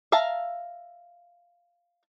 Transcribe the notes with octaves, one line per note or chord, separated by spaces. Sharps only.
E5 F5 A5 A#5